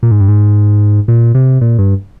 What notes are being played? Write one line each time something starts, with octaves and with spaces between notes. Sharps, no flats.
A#2
G#2
G2
G#2
A#2
C3
A#2
G2